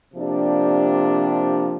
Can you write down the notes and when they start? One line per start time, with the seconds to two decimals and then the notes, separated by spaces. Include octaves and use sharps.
0.14 C3 F3 A#3 D4 G4